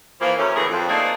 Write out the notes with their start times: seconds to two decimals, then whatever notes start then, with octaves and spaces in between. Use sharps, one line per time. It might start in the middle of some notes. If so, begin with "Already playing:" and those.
0.20 E3 F3 A#3
0.37 F#2 E3 A3 C#4
0.55 D#2 A2 D3 E3 B3 G#4
0.70 F2
0.88 A3 A#3 C4 D4 D#4 G#4